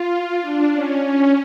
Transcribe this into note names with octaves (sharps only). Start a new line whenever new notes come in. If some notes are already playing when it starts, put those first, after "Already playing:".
Already playing: F4
D4
C#4
C#4